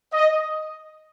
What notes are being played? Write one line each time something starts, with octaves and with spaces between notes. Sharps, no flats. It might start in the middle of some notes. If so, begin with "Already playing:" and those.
D#5